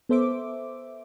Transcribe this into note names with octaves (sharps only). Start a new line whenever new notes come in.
B3 A4 C5 E5 D6